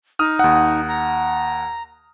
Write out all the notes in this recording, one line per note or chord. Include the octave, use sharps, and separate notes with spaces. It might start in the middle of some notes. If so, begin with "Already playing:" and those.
D#4 D#6 F6
D#2 F#5
A#5